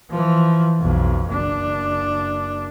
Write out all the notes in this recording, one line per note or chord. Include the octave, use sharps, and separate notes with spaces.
E3 F3
B1 F2
F#1 D4